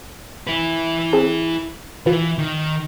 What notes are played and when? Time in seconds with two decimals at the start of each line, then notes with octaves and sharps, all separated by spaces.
0.47 E4 B4
1.13 C4 G#4 A5
2.06 E3 F4 B4
2.38 D#3